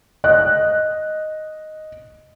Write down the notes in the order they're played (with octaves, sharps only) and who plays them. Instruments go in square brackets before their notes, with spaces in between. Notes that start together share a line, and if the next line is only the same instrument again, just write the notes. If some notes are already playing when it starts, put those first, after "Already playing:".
[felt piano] D#5 F#6